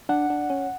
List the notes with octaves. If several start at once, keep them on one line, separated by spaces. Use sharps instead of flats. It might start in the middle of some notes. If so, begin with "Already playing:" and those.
D4 F#5
D4
C#4